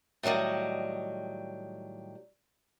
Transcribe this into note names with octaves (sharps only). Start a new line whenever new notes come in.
A2 D#3 F#3 G3 D#5